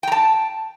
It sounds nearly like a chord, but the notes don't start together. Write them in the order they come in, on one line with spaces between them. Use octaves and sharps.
G5 A#5 A5